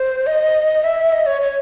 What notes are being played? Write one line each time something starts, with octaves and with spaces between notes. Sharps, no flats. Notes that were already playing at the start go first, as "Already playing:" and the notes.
Already playing: C5
D#5
E5
D#5
C#5
C#5